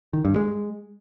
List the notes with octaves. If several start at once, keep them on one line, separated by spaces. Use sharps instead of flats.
D#3
G2
G#3